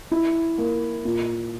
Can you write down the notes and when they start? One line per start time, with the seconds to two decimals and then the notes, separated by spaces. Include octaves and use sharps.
0.11 E4
0.58 A#3
1.05 A#2